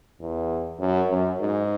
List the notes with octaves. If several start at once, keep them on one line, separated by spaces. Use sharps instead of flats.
E2
F#2
F#2
G#2